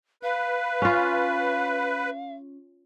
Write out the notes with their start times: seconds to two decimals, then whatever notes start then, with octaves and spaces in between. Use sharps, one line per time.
0.23 B4 F5
0.82 C#4 F4